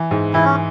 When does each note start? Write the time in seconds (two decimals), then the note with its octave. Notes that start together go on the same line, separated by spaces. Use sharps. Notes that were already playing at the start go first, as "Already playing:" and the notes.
Already playing: E3
0.11 G#2
0.33 E3 E4
0.45 C#4